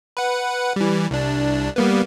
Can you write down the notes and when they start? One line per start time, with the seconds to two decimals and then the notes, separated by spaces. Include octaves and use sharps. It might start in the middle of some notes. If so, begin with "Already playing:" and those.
0.17 B4 F#5
0.76 E3 G3
1.11 C2 D4
1.76 G3 A#3 B3